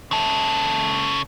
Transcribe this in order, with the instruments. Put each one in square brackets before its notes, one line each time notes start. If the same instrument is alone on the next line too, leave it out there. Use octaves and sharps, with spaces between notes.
[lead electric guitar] C#3 A4